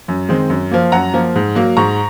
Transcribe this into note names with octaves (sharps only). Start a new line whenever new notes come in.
F#2
D#3 G#3 C4
F#2
F3 A#3
F#2 F#5 A#5
F3 A#3
G#2
F#3 A#3
G#2 A#5 C#6